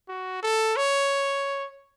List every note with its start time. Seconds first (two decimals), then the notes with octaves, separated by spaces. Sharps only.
0.08 F#4
0.43 A4
0.76 C#5